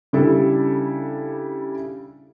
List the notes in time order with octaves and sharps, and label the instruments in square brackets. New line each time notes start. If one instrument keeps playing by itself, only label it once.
[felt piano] C#3 G3 D4 E4 A4